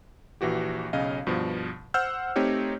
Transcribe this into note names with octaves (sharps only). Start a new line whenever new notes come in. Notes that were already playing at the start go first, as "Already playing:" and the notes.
A#1 E3 F#4 G4
B1 C#3 C#4 D#5 F5
G2 B2 F3
C5 F#5 E6 F6 G6
A3 C4 D#4 G4 C#5